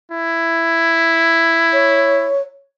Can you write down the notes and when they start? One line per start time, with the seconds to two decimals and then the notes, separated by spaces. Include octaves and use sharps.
0.11 E4
1.73 C#5